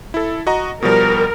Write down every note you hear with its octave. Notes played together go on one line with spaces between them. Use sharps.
E4 A4
F#4 D#5 A#5
B2 F3 G3 A#4